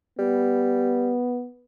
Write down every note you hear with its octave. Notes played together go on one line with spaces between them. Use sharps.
G3 B3